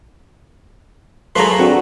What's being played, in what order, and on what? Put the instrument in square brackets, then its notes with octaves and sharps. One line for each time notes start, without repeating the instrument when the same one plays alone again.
[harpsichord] F#3 A3 A#3 [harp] G#4 B4 [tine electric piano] A#5 C6
[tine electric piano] C4 D4 [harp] F#4